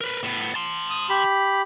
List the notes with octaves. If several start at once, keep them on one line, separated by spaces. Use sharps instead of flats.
A#4 B4
A2 B3
A5 C6
D#6
G4 B5